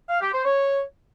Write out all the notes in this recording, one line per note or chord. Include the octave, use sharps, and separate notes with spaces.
F5
G4
C5
C#5